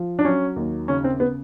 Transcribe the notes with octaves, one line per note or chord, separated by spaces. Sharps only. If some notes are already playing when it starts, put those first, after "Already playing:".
Already playing: F3
D4
F#3 C#4
D#2
C#3 C#4
C4
B3